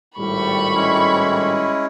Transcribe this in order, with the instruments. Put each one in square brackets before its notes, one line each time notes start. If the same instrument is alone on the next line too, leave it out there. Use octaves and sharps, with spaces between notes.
[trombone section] G#1 A2 G3 [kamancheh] B5 C#6
[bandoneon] G#3 C#4 E4